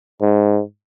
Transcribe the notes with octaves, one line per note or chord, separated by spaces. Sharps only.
G#2